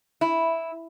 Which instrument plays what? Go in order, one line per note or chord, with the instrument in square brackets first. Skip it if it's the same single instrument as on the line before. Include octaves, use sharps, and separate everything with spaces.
[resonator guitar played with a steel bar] E4